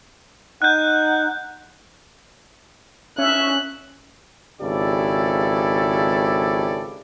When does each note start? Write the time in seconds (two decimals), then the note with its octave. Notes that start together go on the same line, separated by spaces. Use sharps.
0.62 D#4 F#5 F#6 G6
3.18 C#4 E5 F#6
4.61 G#1 C#3 E4 G4 A4 D5